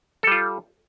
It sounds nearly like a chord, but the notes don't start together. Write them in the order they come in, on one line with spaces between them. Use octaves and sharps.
A4 G3 F4